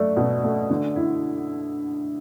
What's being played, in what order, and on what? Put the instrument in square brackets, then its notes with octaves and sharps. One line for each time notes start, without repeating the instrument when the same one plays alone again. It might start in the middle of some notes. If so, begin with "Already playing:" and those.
Already playing: [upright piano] F#3 A3 [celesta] D5
[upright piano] B2
A3
D3
E4